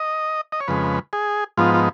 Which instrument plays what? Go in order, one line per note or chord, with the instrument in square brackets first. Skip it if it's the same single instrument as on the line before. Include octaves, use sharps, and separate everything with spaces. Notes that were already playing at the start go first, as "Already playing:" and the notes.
Already playing: [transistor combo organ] D#5
D#5
C#5
F2 C#3 G#3 B4
G#4
G#2 F3 B3 D#4 F4
F4